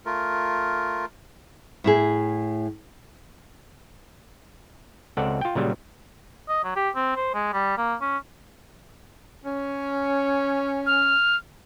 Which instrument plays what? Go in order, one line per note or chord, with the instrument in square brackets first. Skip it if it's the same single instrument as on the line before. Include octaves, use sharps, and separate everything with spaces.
[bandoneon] A3 F4 A#4
[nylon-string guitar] A2 E4 G#4
[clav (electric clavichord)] C#2 C4 A4 D5 F#5
F4 G5
A#2 C#3 F#3 G3
[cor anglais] D#5
F#3
G4
C4
C5
G#3
G3
A#3
C#4
[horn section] C#4
[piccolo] F6